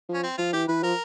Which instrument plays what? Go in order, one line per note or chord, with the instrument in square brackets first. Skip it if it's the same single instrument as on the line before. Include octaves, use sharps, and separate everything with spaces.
[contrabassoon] F3 [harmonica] C#4
[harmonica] C4
[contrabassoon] F3 [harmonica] F4
[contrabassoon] E3 [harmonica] G4
[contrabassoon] E3 [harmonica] B4
[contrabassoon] F3 [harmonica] A#4